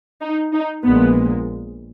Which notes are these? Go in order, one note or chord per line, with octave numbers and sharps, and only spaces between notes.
D#4
D#4
A#1 A#2 G#3 B3